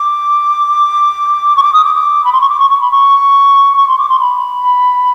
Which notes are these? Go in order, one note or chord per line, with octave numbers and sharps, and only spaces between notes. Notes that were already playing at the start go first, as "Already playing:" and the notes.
Already playing: D6
C#6
D6
D#6
D6
D6
B5
C6
C#6
D6
C#6
C#6
B5
C#6
C#6
C6
D6
C6
B5